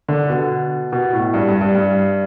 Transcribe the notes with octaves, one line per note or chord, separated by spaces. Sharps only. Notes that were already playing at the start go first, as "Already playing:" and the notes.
D3
B2
B2
A2
G2
G2
G2
G2